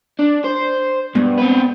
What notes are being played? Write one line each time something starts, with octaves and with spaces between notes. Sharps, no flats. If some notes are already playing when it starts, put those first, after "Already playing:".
D4
C5
G2 G#3 B3
C4 B4